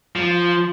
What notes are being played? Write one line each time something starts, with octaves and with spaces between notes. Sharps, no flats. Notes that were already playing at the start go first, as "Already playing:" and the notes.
F3